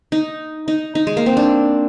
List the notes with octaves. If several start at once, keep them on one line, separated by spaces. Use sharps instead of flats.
D#4
D#4
D#4
G#3
A#3
C4
D4